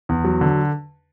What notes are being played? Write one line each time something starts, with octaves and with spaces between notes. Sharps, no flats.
E2
F#3
D3